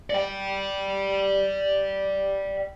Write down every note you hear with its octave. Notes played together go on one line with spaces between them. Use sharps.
D5 G5